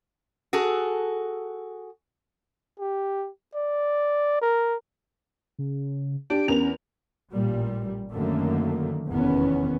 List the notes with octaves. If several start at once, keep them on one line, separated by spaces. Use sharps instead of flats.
F#4 G#4 A4
G4
D5
A#4
C#3
D4 G4 D7
E2 C#4 A#4 F7
A1 A#2 G3
F#2 D3 D#3 A3 A#3
F1 E2 D#3 B3 C#4